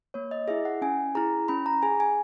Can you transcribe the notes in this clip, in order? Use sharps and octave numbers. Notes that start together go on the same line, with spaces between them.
A#3 C#5
D#5
E4 G#4 E5
F#5
C#4 G#5
E4 G#4 A#5
C#4 B5
A#5
G#4 G#5
G#5